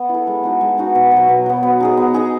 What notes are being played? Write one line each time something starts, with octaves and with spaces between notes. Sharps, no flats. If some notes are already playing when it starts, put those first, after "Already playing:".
Already playing: B3
E4
A4
G#3
B3 D#4 F#4
G#3
B3 D#4 F#4
B2
B3
F#3
B2
F#3 B3
B3
D#4 G#4 D#5
B3
D#4 G#4 D#5